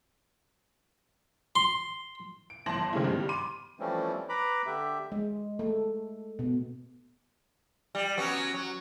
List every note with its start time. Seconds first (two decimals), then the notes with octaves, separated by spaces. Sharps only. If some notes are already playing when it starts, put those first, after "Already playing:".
1.56 C6
2.50 D7
2.66 G1 E3 A5 C6 A#6 F#7
2.93 D#3 F3 G#3 A3 C#4 E4
3.04 G2 B2 G3
3.29 B5 C6 D6 D#7
3.80 E3 F3 G3 A3 C4 C#4
4.29 B4 A#5 B5 D6
4.66 D3 G4 E5
5.12 G#3
5.59 A3
6.39 B2
7.95 G3
8.17 F#3 B3 C#4
8.54 F#3